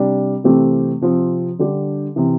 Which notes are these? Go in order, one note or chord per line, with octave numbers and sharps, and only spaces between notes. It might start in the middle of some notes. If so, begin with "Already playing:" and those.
Already playing: C3 G3 D4
C3 E3 A3 C4 G4
C3 F3 C4
D3 G3 D4 G4
C3 E3